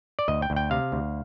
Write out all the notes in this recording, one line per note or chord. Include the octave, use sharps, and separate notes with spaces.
D5
D2 D#5
G5
D2
G5
C3 F5
D2